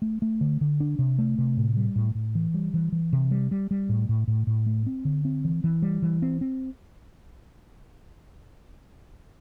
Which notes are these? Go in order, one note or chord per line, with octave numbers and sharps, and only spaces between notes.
A3
A3
D3
D3
D4
C3
A3
C3
A2
G3
A2
A2
E3
G3
E3
E3
C3
G3
G3
G3
A2
A2
A2
A2
A3
C4
D3
C4
E3
E3
G3
E3
C4
C4